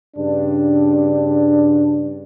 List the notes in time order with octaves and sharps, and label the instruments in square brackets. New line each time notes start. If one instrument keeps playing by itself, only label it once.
[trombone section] G2 C#3 D4